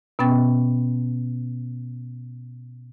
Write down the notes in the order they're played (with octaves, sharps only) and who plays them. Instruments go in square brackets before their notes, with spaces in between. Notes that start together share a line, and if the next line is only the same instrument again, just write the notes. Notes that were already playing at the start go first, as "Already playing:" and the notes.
[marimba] B2 B3 C#4 G5 A6